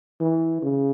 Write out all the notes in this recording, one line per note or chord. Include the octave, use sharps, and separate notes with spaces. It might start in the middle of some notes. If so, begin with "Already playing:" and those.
E3
C#3